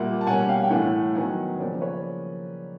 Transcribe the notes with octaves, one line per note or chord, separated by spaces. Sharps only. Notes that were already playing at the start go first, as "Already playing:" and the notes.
Already playing: A#2 G3 A#3 E5 F#5
A5
B2 G3 A#3 C#4 F#5 G#5
F5 G5
G5
A2 E3 A3 F#5 G#5
D#3 F#3 B3 F#5 G#5
C#3 F3 A#3 C#4 C5 D5
B4 C#5